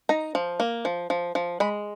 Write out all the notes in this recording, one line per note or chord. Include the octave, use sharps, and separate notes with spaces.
D#4 A#5
F3
A#3
F3
F3
F3
G#3 B5